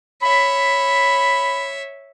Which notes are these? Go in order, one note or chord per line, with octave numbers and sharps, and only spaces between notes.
C#5 E5 B5